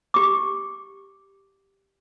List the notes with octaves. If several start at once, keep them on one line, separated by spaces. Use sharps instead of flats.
G4 D6